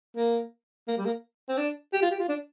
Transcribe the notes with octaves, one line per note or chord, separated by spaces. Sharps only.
A#3
A#3
G3
A#3
C4
D4
G4
F4
G4
F4
D4